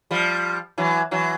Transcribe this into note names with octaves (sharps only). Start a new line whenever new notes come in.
F3 G3
E3 F#3
E3 F#3